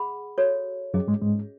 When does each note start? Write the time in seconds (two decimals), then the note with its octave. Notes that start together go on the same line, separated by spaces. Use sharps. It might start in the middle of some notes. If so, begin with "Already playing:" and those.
Already playing: G#4 F#5 B5
0.38 F#4 A4 C#5
0.94 F#2 F#3 C#4 G#4 D#5
1.07 G#2 G#3
1.21 G#2 G#3